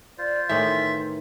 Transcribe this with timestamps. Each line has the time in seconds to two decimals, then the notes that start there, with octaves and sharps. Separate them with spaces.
0.18 F4 C5 D5
0.49 A2 D#3 E3 E5 C6